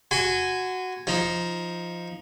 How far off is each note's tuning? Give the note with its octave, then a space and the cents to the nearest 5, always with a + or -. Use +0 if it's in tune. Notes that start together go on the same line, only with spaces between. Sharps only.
F#4 +0 G#5 +0 C6 -45
F3 -10 D#4 +5